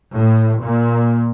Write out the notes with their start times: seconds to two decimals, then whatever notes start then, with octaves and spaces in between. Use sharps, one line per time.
0.15 A2
0.62 A#2